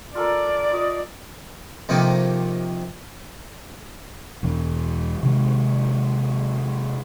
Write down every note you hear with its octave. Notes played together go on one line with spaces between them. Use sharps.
F4 A4 A#4 D5
F4 D#5
F2 C3 D#3 A#3
E1 E3
C3 D#3 G#3